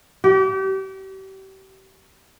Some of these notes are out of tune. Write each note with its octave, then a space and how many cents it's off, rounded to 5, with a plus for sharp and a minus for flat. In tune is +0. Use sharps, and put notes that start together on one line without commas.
G4 -35